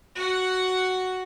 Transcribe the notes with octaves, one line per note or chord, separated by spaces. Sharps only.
F#4 F#5